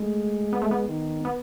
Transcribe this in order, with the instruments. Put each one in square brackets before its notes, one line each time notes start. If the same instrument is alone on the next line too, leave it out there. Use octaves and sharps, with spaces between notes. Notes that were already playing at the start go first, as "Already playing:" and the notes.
Already playing: [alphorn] G#3 [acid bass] A3
[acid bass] B3
A3
B3
[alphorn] D#3
[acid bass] B3